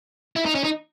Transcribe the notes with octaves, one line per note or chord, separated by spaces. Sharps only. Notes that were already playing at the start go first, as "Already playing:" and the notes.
E4
D#4
C#4
D#4